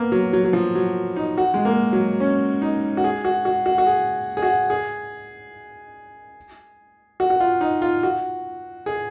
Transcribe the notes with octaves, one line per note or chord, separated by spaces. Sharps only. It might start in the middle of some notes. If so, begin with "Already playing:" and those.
Already playing: A#3 B3
F#3
F#3
F#3
F3
F#3
D#4
F#4
G#3
A#3
F#3
C#4
D#4
F#4
G#4
F#4
F#4
F#4
F#4
G#4
G#4
F#4
G#4
F#4
F#4
F4
D#4
F4
F#4
G#4